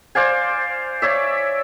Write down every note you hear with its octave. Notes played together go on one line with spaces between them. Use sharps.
C5 D5 F5 G#5
C#5 D5 E5